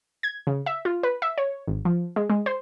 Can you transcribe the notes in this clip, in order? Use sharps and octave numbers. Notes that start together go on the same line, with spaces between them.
G#6
C#3
E5
F4
B4
E5
C#5
G#1
F3
G#3
G#3
C5